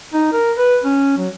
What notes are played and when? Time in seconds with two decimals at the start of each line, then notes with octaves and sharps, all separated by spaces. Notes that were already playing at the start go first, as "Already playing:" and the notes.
0.14 D#4
0.33 A#4
0.57 B4
0.84 C#4
1.17 F#3